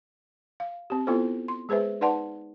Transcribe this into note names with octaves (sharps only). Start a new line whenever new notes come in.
F5
C4 G4
B3 E4 F4 A4 C5
C6
G#3 G#4 B4 C5 E5
D#4 B4 D5 F#5 A5 C6